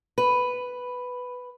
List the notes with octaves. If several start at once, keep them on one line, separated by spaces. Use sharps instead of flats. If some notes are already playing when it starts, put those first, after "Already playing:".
B4